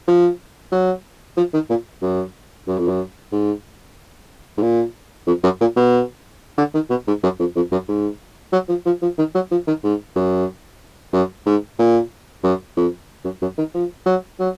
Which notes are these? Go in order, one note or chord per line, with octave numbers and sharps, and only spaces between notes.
F3
F#3
F3
D#3
A#2
F#2
F#2
F2
F#2
G#2
G#2
A#2
F2
F#2
A#2
B2
D3
D#3
B2
G#2
F#2
F2
F2
F#2
G#2
F#3
F3
F3
F3
D#3
F#3
F3
D#3
G#2
F#2
F#2
G#2
A#2
F#2
F2
F#2
F#2
D#3
F3
F#3
F#3